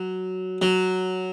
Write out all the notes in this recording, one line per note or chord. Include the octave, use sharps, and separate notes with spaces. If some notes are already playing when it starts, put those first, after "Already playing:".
Already playing: F#3
F#3